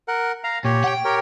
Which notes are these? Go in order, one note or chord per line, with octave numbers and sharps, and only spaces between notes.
A#4 F#5
F5 A#5
A#2 G4 C#5
F#5 G5
G4 A#4 C#5